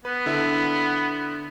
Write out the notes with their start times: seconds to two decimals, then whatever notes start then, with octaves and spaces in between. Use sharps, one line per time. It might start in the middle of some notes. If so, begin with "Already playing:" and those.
0.05 B3 B4
0.26 D3 E4 E5